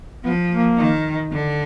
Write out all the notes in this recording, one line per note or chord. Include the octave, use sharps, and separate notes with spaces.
F3 B3
A#3
D#3
D3